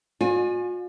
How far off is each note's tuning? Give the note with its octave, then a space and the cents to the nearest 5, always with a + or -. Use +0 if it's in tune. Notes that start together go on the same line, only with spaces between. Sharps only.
F4 +45 D5 +45 G#5 +0